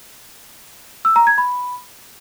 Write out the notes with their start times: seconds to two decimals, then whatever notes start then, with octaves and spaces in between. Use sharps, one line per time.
1.05 E6
1.16 A#5
1.27 G#6
1.38 B5